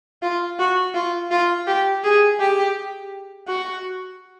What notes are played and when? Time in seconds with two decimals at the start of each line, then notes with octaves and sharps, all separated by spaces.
0.22 F4
0.59 F#4
0.94 F4
1.31 F4
1.67 G4
2.04 G#4
2.40 G4
3.48 F#4